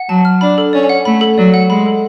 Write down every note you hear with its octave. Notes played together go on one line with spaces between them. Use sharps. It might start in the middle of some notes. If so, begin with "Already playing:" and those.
Already playing: F#5
F#3 A5
F6
D4 B5
A4
C#4 D5
F#5
A3 B5
A4
F#3 D5
F#5
G#3 B5
A4